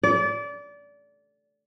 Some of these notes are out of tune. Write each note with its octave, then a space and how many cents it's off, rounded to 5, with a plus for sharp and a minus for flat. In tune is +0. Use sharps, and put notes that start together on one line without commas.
D5 -25